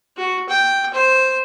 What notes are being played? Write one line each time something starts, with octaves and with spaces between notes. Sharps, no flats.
F#4
G5
C5